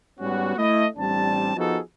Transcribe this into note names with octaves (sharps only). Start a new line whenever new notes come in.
G#2 G3 B3 C#4 F#4
A3 E4 D#5
A1 G3 C4 D4 A5
F3 B3 D#4 F#4 G#4 A4